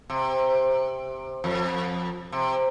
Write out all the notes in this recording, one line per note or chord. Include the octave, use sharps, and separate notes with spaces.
C3
F2
C3